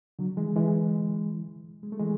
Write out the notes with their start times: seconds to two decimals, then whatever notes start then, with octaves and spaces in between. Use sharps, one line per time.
0.19 D3 F#3
0.37 E3 G#3
0.56 E3 G#3
1.83 G#3
1.92 A3
2.00 E3 G#3